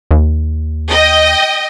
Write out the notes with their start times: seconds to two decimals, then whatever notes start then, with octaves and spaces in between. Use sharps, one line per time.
0.11 D#2
0.91 D#5 G5